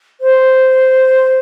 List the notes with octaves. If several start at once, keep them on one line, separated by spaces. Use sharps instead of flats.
C5